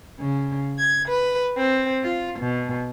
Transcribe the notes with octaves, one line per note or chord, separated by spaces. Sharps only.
C#3
G#6
B4
C4
F4
B2